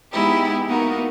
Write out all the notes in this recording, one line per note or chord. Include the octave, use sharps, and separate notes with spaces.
G#3 B3 D#4 E4 G4
A#3 B3 D#4 F#4 A#4